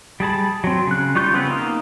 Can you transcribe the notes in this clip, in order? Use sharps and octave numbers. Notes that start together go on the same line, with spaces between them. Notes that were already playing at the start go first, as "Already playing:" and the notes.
G3 G#4 A5 B5
F#3 C4
C#3 F#6
G3 F4 C#6 G6
C#3 B3 C4 B4
A#3 D#4 F5